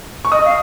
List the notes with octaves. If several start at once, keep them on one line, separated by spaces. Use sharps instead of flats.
C#6
D#5 D#6
F5